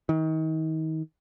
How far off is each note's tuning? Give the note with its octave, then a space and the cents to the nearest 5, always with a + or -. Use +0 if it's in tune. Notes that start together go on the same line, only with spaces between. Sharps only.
D#3 +30